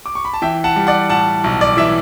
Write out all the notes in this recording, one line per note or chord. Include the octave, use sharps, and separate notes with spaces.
D6
C#6
B5
A5
E3 E5 G5
F#5 A5
G3
D5 F#5
A2 F#5 A5
B1
D5
E3 E5